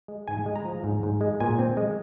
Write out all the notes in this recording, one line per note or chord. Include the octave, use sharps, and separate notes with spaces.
G#3
G#2 G#5
G#3
A#5
F3
G#2
G#2
G#3
A#2 G#5
C4
G#3